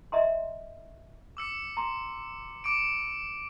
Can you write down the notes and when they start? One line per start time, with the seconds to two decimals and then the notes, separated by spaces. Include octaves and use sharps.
0.12 D#5 E5 A#5 C6
1.37 D6 E6 C#7
1.77 A#5 C6
2.64 D6 C#7 D7